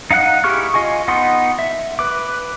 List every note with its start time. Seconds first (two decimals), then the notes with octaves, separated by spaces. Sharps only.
0.11 D#4 F5 F#5 F#6
0.44 E4 G4 G#4 C#6 F6
0.74 F4 D#5 G#5 C#6
1.08 B3 D#4 F#5 C6 D#6
1.59 E5
1.99 B4 D6